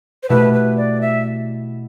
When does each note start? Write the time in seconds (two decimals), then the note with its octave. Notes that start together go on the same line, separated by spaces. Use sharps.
0.23 C5
0.29 B2 A3 E4 G4 B4
0.53 B4
0.77 D5
1.01 E5